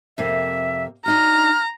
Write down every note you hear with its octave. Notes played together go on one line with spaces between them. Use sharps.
F2 C3 A#3 E5
D4 D#4 F#4 A#5 F6